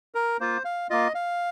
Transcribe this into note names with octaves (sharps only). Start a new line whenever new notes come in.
A#4
A#3 F4 C5
F5
A#3 F4 D#5
F5